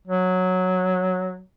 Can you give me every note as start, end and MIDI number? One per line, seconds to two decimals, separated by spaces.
0.08 1.41 54